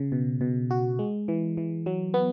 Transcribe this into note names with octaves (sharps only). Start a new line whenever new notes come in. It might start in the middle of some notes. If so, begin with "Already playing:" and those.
Already playing: C#3
B2
B2
F#4
G#3
E3
E3
F#3
B3